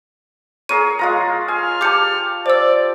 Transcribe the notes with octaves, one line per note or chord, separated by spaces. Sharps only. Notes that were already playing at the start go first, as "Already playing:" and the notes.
G#4 A#4 C#5 D#7
G#3 F4 A#5
G#5 F6
G4 A5 D6 G6 C#7
C5 D5 E6